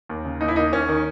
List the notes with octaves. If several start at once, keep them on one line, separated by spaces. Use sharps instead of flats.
D#2
C#3
D#2 D#4
E4
A#3 D#4
D#2 C#4
D#3